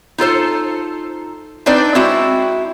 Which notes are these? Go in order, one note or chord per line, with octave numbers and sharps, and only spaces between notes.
D#4 F4 A4 C5
C4 D4 D#4 B4 D5
G#3 C4 E4 F#4